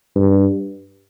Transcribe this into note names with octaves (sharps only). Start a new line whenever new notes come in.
G2